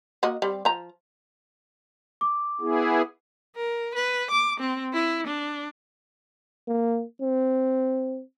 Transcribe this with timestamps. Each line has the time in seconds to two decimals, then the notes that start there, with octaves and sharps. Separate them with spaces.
0.23 A#3 F#4 D#5
0.42 G3 C4
0.65 F3 A#5
2.21 D6
2.61 B3 E4 G#4
3.56 A#4
3.95 B4
4.31 D6
4.60 C4
4.93 E4
5.27 D4
6.68 A#3
7.22 C4